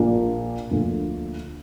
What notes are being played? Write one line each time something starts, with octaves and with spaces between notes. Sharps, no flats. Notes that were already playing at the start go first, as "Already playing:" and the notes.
Already playing: A#1 A#2 F3 A#3 D4
D2 D3 F3 A#3